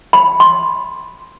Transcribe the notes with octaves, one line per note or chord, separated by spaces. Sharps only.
B5
C6